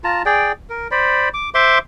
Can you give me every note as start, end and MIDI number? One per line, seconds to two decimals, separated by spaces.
0.04 0.23 65
0.04 0.23 81
0.04 0.23 82
0.26 0.52 68
0.26 0.52 74
0.26 0.52 79
0.70 0.88 70
0.91 1.29 72
0.91 1.29 74
0.91 1.29 83
1.34 1.50 86
1.54 1.79 72
1.54 1.79 76
1.54 1.79 84
1.54 1.79 86